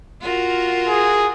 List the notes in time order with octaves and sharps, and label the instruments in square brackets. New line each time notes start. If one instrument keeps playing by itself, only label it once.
[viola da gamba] F4 F#4 A#4
[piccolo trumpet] G#4